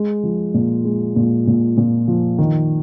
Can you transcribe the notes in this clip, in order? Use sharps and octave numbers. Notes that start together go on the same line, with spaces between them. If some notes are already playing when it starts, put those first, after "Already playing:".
Already playing: G#3
F3
A#2
G#3
A#2
A#2
A#2
F3
D#3